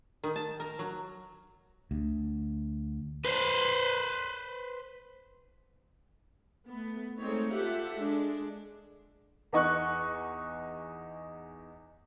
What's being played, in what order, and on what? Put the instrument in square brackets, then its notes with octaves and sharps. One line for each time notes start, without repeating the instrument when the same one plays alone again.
[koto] D#3
A5
A#4
F#3
[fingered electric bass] D2
[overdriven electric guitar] B4 C5
[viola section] A3 B3
G#3 A3 C4 D#4 C#5
F4 G4 A4 E5 F#5
G#3 D4
[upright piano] E2 D#4 C#6 F#6